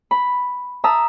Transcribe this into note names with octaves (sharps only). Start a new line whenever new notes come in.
B5
E5 A5 A#5 D#6 E6